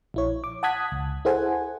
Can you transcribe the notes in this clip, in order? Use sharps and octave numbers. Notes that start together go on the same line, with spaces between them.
A#1 E4 C#5
D6
F#5 A5 D#6 F#6 G#6 B6
C#2
E4 G#4 A4 C5 F#5 G#5